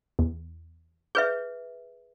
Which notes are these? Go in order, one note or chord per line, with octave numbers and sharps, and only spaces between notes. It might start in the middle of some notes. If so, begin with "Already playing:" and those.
E2
G#4 B4 E5 G6